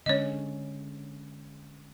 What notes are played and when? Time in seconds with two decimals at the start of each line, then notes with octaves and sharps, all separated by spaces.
0.06 D3 G#3 C#4 C#5 D#5